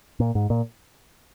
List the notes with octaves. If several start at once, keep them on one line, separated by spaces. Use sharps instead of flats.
A#2
G#2
A#2